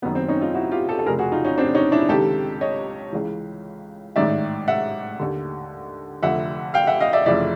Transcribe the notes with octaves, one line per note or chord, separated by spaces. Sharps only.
F#1 F#2 D#3 B3
C4
C#4 D#4
D#4 F4
E4 F#4
F4 G4
G4 A4
A4
F1 F2 C#3 G#4 A#4
F#4 G#4
D#4 F4
C#4 D#4
C4 D4
C#4 D#4
D4 E4
C#2 C3 D#3 G4 A4
C#5 D#5
C#2 C#3 E3
A1 G#2 D#3 D5 E5
E5 F#5
D#2 D3
F1 F2 D3 E5 F#5
F5 G5
E5 F#5
D#5 F5
D5 E5
F1 F2 C#3 E3 D5 E5